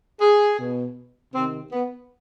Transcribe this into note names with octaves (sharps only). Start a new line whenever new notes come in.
G#4
B2
C3 D#3 C4
B3